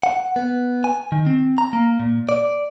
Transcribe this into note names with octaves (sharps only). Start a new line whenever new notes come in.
F#5
B3
G#5
D#3
C4
A#5
A#3
A#2
D5